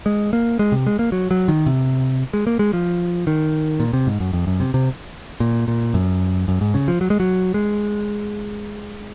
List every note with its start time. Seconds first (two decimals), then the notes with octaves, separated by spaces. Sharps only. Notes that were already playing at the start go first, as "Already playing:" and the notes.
0.06 G#3
0.33 A#3
0.59 G#3
0.72 C3
0.87 G#3
0.99 A#3
1.12 F#3
1.31 F#3
1.48 D#3
1.66 C3
2.33 G#3
2.47 A#3
2.59 G#3
2.73 F3
3.27 D#3
3.80 A#2
3.93 C3
4.07 G#2
4.20 F#2
4.33 F2
4.47 F#2
4.60 C3
4.74 C3
5.40 A#2
5.68 A#2
5.94 F#2
6.48 F#2
6.61 G#2
6.74 C#3
6.88 F3
7.01 F#3
7.10 G#3
7.20 F#3
7.54 G#3